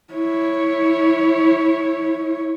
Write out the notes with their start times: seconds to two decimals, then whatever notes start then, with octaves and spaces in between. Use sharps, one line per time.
0.14 E4 C#5